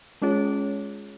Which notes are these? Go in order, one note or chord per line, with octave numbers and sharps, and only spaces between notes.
G#3 C#4 F4 G#4 C#5